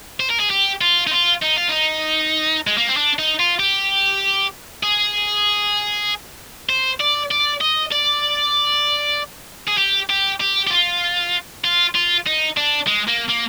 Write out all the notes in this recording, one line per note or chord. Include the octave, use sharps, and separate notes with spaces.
C5
A#4
G#4
G4
F4
D#4
F4
D#4
F4
D#4
G#3
A#3
C4
D4
D#4
F4
G4
G#4
C5
D5
D5
D#5
D5
G#4
G4
G4
G4
G4
F4
F4
F4
D#4
D4
G#3
A#3
A#3